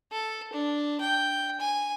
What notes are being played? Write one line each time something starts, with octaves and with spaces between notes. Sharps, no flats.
A4
D4
G5
G#5